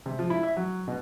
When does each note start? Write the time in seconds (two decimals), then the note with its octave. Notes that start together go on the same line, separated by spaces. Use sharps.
0.06 C3
0.19 F3
0.30 E4
0.43 E5
0.57 F#3
0.88 B2